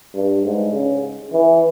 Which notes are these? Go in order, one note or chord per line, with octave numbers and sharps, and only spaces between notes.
G2
G#2
C#3
E3